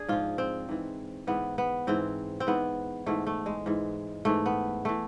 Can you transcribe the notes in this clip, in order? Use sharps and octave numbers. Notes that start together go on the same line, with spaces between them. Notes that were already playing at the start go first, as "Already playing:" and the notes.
Already playing: D4 G#4
G#2 F3 F4
C4
G#2 E3
G#2 E3 B3
B3
G#2 E3 C4
C4
G#2 E3 B3
G#2 E3 A3
A3
G#3
G#2 E3
G#2 E3 A3
B3
E3 A3